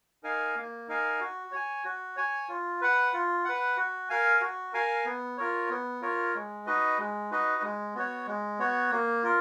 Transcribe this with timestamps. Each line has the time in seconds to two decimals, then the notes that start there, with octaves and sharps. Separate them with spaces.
0.23 D#4 A#4 F5 G#5
0.56 A#3
0.88 D#4 A#4 F5 G#5
1.20 F#4
1.52 C#5 G#5
1.84 F#4
2.16 C#5 G#5
2.49 F4
2.81 B4 F#5
3.13 F4
3.45 B4 F#5
3.77 F#4
4.09 A#4 F5 G#5
4.41 F#4
4.73 A#4 F5 G#5
5.05 B3
5.38 F4 A#4 C#5
5.70 B3
6.02 F4 A#4 C#5
6.34 G#3
6.66 D#4 F#4 B4 D#5
6.98 G#3
7.31 D#4 F#4 B4 D#5
7.62 G#3
7.95 B3 F#4 C#5
8.27 G#3
8.59 B3 F#4 C#5
8.91 A#3
9.23 F4 A#4